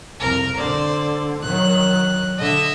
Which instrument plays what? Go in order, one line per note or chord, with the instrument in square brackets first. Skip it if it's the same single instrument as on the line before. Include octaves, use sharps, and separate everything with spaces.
[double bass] C2 F2 [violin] A#4
[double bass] D3 [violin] C5 D5
[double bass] D#3 F#3 [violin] F#6
[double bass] D3 [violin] D#5 E5